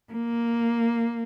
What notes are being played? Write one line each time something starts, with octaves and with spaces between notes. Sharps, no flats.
A#3